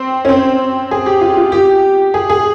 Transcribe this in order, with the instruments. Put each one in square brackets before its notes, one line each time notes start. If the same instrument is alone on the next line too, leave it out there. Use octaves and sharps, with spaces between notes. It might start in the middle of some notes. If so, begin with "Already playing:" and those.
Already playing: [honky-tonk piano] C4
C#4
C4
G#4
G4
F4
F4
G4
G#4
G#4